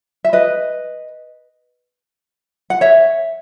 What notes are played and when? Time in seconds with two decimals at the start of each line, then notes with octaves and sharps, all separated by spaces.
0.25 E5
0.33 B4 D#5
2.70 F#5
2.81 C#5 E5